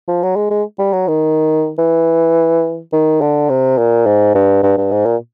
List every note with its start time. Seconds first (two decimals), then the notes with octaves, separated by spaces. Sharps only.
0.08 F3
0.23 F#3
0.36 G#3
0.50 G#3
0.79 G3
0.93 F#3
1.08 D#3
1.78 E3
2.93 D#3
3.21 D3
3.49 C3
3.78 A#2
4.06 G#2
4.35 G2
4.63 G2
4.78 G2
4.91 G#2
5.06 A#2